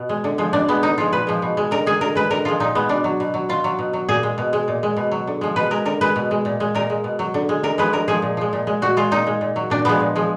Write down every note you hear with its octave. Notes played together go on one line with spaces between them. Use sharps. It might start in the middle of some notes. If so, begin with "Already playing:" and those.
Already playing: B2
G#3
D3
F3 G#3
B2 D4
G#3 B3
D3 D#4
F3 G#3 F4
A#2 B4
F3 G#3
B2
G#3
D3 A#4
G#3 G#4
D3 A#4
G#3 B4
D3 A#4
F3 G#3 F4
A#2 D#4
G#3 B3
B2 D4
F#3
B2
F#3
B2 F4
F#3
B2
F#3
A#2 G#4
G#3
B2
G#3
A#2
G#3
B2
F#3
D3
F3 G#3
B2 B4
G#3 A#4
D3 A#4
G#3 B4
B2
G#3
A#2
G#3
A#2 A#4
G#3
B2
F#3
D3
G#3
D3 A#4
F3 G#3 B4
D3 A#4
F3 G#3 G#4
A#2
F3 G#3
A#2
G#3
A#2 F#4
G#3 F4
A#2 D#4
G#3
A#2
F#3
A#2 D4
F3 G#3 B3
A#2
F3 G#3